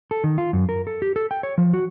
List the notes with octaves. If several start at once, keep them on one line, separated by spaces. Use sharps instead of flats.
A4
D#3
F4
F#2
A#4
A4
G4
A4
G5
C#5
F3
F#4